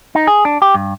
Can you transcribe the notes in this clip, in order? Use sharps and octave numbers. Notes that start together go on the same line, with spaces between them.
D#4
G#4
D4
G4
G2